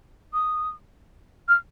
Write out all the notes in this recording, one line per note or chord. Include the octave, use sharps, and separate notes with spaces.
D#6
F6